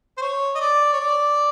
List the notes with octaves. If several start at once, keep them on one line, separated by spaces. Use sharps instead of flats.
C5
C#5
D#5
D5
C#5
D5